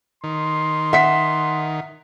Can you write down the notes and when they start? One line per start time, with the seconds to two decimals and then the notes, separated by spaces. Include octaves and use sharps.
0.24 D#3 C6
0.93 E5 F#5 B6